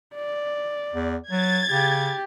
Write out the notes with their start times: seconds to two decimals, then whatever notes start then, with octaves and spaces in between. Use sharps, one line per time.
0.15 D5
0.94 E2
1.31 F#3 G#6 A6
1.70 C#3 G4